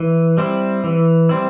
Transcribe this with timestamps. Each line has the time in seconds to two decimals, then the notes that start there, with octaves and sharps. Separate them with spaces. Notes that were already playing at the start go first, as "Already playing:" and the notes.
Already playing: E3
0.38 G3 C4 E4
0.84 E3
1.29 G3 C4 E4